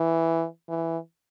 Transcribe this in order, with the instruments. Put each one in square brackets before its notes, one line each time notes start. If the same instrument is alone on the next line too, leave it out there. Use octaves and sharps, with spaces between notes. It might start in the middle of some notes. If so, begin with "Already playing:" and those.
Already playing: [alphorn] E3
E3